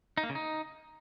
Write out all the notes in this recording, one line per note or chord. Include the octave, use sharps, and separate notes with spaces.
D#4
A#3
C#3
D#4